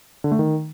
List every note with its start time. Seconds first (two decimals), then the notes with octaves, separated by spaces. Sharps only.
0.24 D3
0.32 A3
0.39 D#3